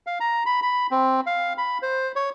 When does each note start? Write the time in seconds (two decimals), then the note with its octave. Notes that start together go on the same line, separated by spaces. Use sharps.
0.07 F5
0.20 A#5
0.46 B5
0.62 B5
0.91 C4
1.26 F5
1.58 B5
1.82 C5
2.16 C#5